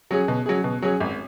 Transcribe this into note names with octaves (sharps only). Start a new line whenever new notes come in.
F#3 C#4 G#4
B2
F#3 C#4 G#4
B2
F#3 C#4 G#4
G#1